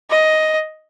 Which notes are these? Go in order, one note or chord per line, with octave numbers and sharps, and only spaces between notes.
D#5